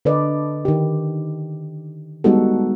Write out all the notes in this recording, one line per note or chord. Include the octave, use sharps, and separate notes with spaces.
D3 A4 B4 D5 D#5
D#3 G4
G3 G#3 B3 D#4 F#4 A4